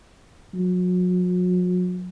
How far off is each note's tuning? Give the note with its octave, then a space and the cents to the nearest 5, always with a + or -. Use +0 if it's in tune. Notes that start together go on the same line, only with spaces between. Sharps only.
F#3 -40